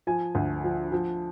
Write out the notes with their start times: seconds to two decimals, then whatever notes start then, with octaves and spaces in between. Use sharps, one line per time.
0.07 F3 G#5
0.35 D2
0.64 F3
0.92 F3